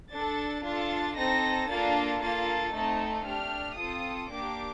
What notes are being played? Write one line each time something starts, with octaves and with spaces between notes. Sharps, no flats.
D4 A4 A6
D4 F4 A4 A6
C4 D#4 A4 A#6
A#3 D4 F4 A4 A6
A#3 F4 A4 A6
A3 C4 D#4 A4
A3 D4 G4 F6
C4 F4 A4 D#6
A#3 D4 G4 D6